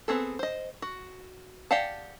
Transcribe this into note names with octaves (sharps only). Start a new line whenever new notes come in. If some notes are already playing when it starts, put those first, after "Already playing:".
B3 C4 G#4 A4
C5 D#5
F#4
G4 D5 F5 F#5 A5